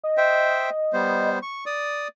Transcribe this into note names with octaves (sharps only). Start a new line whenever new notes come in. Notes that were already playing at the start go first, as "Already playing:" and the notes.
D#5
C5 E5 G5
G3 B3 C5
C#6
D5 D#6